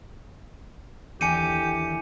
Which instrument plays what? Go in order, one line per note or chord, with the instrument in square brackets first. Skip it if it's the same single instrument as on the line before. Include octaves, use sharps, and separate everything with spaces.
[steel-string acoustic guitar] D#2 D3 E3 [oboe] G4 [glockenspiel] G#5 C#7 D#7